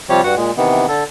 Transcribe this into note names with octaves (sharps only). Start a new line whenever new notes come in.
C3 F3 G3 G4 C#5
G2 F#4 F#5
A#2 G#3
C3 D#3 E3 B3
D3 A4